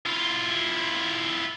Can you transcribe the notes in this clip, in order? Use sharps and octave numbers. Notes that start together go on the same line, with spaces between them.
E4 F4